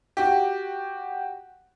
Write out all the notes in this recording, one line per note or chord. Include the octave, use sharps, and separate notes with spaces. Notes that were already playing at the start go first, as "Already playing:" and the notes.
F#4 G4